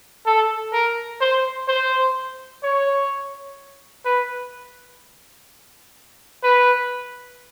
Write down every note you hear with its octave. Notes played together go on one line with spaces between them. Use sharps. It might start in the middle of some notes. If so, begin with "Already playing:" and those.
A4
A#4
C5
C5
C#5
B4
B4